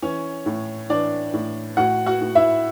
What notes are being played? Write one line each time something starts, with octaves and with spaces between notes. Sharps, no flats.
E3 C#4 C#5
A2
E3 D4 D5
A2
A2 F#4 F#5
F#4 F#5
A2
E4 E5